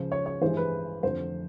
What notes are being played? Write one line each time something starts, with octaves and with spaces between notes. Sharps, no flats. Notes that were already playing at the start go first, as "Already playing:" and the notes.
Already playing: C#2 C#3 F3 C5
C#5
C#5
A1 G2 E3 G#3 C5
B4
F1 F2 D3 C5